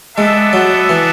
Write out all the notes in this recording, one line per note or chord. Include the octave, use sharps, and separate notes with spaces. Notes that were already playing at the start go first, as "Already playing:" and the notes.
G#3 B3 D4 A4 E5
F#3
E3